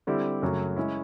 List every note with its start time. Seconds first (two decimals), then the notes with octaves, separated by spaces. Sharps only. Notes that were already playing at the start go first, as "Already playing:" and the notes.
0.07 D3 G3 C4 E4 G4
0.42 F#2 C#3 F#3 A3
0.76 G#3 C#4 E4